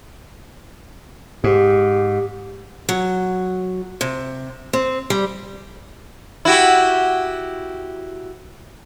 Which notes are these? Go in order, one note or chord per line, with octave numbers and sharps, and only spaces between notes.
G#2 G4
F#3
C3
C4
G3
E4 F#4 G4